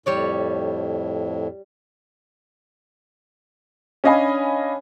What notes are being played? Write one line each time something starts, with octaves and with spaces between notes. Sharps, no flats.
F2 A2 G3 C#5 D5
C#4 D4 D#5 F5 G#5 B5